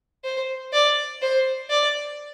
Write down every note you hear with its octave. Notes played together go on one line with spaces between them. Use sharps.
C5
D5
C5
D5